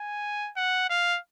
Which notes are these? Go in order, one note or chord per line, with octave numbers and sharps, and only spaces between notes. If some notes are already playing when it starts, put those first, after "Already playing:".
Already playing: G#5
F#5
F5